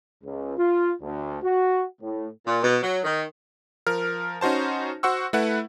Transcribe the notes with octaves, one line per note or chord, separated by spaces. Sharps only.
C#2
F4
D2
F#4
A2
A#2
B2
F#3
D#3
F3 A#4 F6
C#4 D#4 F#4 C5 A5
F#4 C5 F#5 C#6 E6
A3 E4 B4 F#5